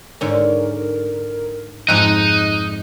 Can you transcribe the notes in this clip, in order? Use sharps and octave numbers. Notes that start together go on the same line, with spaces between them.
G#2 D3 C#4 A#4
F2 G#2 D#4 D#5 F#6